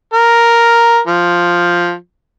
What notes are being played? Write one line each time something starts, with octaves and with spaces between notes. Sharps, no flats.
A#4
F3